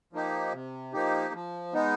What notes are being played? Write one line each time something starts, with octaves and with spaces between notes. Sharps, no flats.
F3 A#3 D#4 G4
C3
F3 A#3 D#4 G4
F3
G#3 B3 D#4